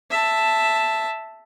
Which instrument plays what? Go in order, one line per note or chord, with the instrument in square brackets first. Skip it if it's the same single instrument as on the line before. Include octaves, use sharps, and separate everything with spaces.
[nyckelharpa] E5 A5